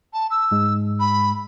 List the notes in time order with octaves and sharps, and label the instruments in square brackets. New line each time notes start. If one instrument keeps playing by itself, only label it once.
[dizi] A5
E6
[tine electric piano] G#2 G#3
[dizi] B5